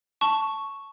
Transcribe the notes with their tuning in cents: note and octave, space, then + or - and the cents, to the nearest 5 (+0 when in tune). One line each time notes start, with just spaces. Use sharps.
A5 +0 C#6 +0